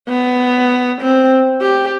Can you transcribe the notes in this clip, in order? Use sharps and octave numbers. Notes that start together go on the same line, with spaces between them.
B3
C4
G4